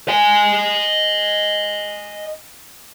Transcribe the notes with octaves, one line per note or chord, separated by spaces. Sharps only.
D#5 G#5